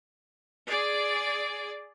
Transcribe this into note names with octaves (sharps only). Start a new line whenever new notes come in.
G#4 D5